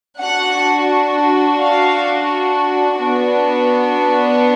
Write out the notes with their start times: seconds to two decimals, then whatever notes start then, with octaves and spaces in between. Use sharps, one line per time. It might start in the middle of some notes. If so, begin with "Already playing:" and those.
0.19 D4 F#4 F#5
1.60 F5
2.99 B3 D4 F#4